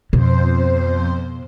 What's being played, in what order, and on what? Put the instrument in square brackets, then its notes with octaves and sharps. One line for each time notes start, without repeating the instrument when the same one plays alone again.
[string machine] F2 C5 [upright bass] B2